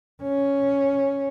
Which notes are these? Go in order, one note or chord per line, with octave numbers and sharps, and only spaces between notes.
C#4